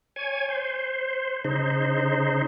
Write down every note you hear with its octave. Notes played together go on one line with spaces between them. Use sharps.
C#5 G#5
C5
C#3 D#4 C5